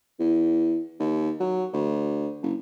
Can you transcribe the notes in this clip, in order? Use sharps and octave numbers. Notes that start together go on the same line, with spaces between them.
E2
D#2
F#3
D2
F#1